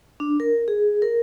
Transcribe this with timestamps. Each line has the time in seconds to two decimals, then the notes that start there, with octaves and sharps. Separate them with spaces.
0.20 D4
0.40 A#4
0.68 G#4
1.02 A#4